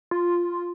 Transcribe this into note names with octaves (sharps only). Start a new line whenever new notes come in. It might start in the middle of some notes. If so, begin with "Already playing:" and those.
F4